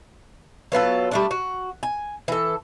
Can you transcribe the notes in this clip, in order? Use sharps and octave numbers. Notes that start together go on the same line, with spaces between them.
F#3 B3 F4 A4
G3 A3 D4
F#4
G#5
E3 A4